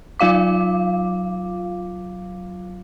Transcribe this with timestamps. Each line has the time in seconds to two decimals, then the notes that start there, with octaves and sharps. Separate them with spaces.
0.20 F#3 F4 F5 D6